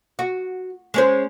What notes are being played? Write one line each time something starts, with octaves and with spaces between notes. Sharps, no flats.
F#4
G#3 C#4 C5